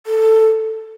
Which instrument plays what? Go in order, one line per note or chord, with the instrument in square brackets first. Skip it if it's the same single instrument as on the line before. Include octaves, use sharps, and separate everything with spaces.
[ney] A4